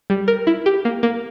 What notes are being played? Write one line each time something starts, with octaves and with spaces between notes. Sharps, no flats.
G3
A#4
E4
G4
A#3
A#3